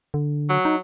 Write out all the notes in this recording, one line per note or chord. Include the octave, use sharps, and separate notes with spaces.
D3
F#3
D#4